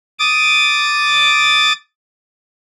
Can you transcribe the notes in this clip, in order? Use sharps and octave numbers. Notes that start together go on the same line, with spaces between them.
D6 D#6 A6